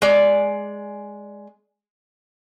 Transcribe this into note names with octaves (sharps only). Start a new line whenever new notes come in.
G#3 D5